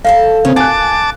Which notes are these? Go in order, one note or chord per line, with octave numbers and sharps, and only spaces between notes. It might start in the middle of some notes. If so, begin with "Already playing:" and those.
A4 C#5 F5 A5
C#3 A#3 C4
A#2 F#5 G#5 A5 D6 F#6